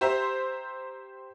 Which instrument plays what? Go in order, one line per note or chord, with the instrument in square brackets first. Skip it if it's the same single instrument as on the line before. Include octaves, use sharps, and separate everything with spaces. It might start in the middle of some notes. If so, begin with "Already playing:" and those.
[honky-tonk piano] G4 C5 E5 A#5 C6